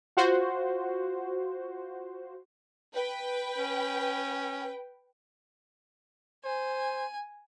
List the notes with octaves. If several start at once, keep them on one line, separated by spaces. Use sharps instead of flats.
F4 F#4 C5
B4 G5
C#4
C5 G#5